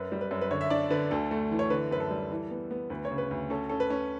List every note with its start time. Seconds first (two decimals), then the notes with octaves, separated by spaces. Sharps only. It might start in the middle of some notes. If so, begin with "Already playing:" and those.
Already playing: F#2 B4
0.12 G3
0.21 B4
0.31 F#2
0.41 B4
0.51 D3 C#5
0.61 E5
0.70 D4 D5
0.90 D3 B4
1.11 D2 A4
1.31 A3
1.51 E3
1.59 C#5
1.70 D3 B4
1.91 F#2 B4
2.00 A4
2.11 G3
2.31 E3
2.51 B3
2.71 B3
2.90 D2 B4
3.05 C#5
3.11 C#3
3.18 B4
3.31 D2
3.50 C#4 A4
3.69 C#4 A4
3.80 B4
3.90 C#4